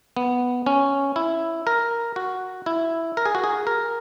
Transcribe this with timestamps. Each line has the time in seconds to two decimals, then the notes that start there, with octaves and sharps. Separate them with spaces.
0.17 B3
0.66 C#4
1.16 E4
1.67 A#4
2.16 F#4
2.66 E4
3.17 A#4
3.26 G#4
3.35 F#4
3.44 G#4
3.67 A#4